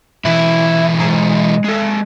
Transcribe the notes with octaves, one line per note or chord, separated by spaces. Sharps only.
B1 E3 E4
G#3 A#5
G#3 A4